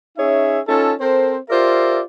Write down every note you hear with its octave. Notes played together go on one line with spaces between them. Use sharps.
C#4 D#4 G#4 C#5 E5
C#4 D#4 F4 A4
C4 A4 A#4 C5
F4 G4 A#4 C5 D5 E5